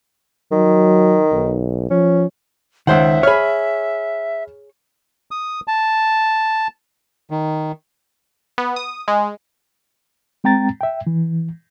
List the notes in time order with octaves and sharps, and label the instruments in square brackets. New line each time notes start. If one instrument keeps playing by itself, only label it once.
[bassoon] D#3 [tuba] F#3
[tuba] B1
[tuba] F3 [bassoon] C#4
[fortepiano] C#2 C5 F#5 [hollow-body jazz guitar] D#3 [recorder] E5
[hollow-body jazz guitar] G#4 C#5 [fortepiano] B5 F6
[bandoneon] D#6
A5
D#3
[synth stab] B3
D#6
G#3
[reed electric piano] G#3 C4 G5 A#5 A6
E5 G5
E3